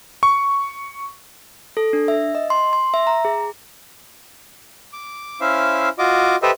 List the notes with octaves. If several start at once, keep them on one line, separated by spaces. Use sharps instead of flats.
C#6
A4
D4
E5
D#5
C6
C6
E5
A#5
G#4
D6
C#4 E4 C5 E5 F5
F4 F#4 D#5 D6
G4 A4 B4 C5 D#5 E5